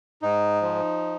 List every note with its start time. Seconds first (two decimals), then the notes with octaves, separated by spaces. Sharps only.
0.22 G#2 D#4
0.62 F3